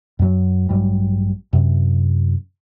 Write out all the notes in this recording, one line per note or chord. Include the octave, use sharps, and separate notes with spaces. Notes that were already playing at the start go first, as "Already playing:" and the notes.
F#2 F#3
A1 G2 F#3 G3
F#2 C3